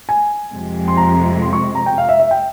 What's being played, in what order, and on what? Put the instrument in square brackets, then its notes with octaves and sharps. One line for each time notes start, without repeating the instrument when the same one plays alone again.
[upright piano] G#5
[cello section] F2 C3 F3 G#3
[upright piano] C6
A#5
C6
C#6
A#5
G5
F5
E5
E5
G5